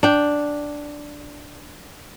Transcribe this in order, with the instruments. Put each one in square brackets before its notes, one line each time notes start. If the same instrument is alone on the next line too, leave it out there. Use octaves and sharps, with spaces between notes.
[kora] D4 G5